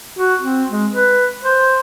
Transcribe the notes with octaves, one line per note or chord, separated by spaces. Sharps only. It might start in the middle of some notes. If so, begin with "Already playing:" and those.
F#4
C4
G#3
B4
C5